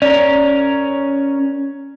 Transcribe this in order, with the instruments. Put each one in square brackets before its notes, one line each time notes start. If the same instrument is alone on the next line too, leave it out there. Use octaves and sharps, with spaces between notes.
[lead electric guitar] C#4 A#4 [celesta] D5 F7